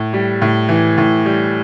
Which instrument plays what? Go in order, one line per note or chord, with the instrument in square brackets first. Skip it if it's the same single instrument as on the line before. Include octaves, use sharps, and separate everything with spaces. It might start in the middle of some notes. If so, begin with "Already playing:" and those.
Already playing: [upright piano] A2
G3
A2
E3
A2
G3